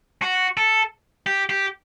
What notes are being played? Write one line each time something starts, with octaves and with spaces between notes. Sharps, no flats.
F#4
A4
G4
G4